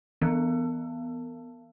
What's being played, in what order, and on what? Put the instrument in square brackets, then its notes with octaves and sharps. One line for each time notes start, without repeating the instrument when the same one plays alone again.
[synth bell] E3 B3